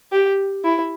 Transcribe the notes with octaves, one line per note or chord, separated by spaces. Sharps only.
G4
E4